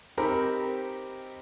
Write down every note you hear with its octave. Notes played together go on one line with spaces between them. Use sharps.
C4 D#4 G4 A#4 B5